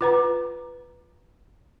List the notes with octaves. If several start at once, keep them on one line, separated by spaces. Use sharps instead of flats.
F4 B4 A#5